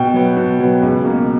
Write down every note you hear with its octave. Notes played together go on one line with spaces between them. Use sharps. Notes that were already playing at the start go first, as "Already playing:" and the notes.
Already playing: B2 G5
F#3 B3
B2
F#3 B3
C#2
B2 A#3